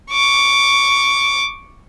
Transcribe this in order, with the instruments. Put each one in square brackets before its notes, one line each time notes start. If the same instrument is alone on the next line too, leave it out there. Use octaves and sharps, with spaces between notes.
[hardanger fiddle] C#6 D6